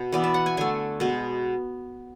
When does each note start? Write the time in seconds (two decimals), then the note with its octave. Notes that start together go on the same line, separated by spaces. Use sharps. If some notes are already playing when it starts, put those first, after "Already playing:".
Already playing: B2 F#5
0.12 E3 B3 D5
0.24 E5
0.34 F#5
0.46 G#5
0.57 D3 A3 G#5
1.00 B2 G#3 B3